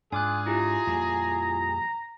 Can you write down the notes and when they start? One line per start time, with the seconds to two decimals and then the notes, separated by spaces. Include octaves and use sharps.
0.12 G#2 D4 F4 G#4 G#5 D6 F#6
0.46 E4 F4 G4 A#5
0.87 F2 A#2 G3